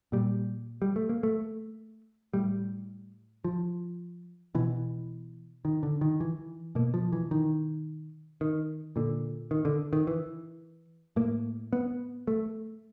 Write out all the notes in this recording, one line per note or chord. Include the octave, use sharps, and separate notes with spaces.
A#2 G3
G3
A3
A#3
A3
A2 G3
F3
B2 E3
D#3
D3
D#3
E3
B2 A#3
F3
E3
D#3
D#3
A#2 D3
D#3
D3
D#3
E3
A2 A#3
B3
A3